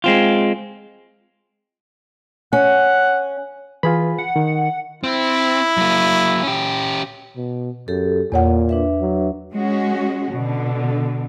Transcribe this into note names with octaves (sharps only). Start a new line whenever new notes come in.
G#3 C4 F4
C#4 F#5
E3 F4 G#4 B5
F#5
D#3
C4 E4
F#3 A#3
C#4 G4
B2
F#2 G4 A4
E2 A#2 A#3 C#5 F#5
D4 B4 E5
F#3
G#3 C#4 F#4
B2 D3